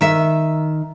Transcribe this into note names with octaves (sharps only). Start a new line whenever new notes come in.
D#3 E5